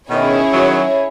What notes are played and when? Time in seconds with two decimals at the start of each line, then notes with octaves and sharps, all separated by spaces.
0.10 B2 D#3 C#4 E4 G#4 C#5
0.53 D#3 F#3